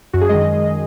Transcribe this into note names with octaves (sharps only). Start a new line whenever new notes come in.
F#2 F#4
G#4
D#3 G#3 D#5